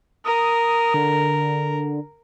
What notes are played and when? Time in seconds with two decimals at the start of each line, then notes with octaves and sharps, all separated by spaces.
0.25 A#4 D#6
0.94 D3